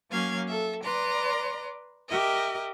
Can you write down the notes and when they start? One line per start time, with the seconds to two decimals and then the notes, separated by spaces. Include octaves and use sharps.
0.10 F#3 A#3 C#4 F5 G#6
0.49 A4 E5
0.83 B4 D5 A#5 C6
2.10 G4 A#4 D#5 E5